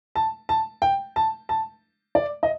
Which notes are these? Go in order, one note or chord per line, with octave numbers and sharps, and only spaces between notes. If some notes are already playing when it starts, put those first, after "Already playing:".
A5
A5
G5
A5
A5
D5
D#5